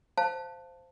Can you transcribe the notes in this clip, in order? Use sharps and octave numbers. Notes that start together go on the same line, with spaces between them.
C5 F5 A5